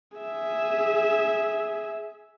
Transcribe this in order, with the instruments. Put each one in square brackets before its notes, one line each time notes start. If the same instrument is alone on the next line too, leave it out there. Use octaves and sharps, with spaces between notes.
[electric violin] G#4 E5